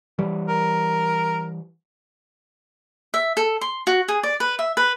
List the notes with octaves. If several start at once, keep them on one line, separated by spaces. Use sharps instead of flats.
E3 G3
A#4
E5
A4
C6
F#4
G#4
D5
B4
E5
B4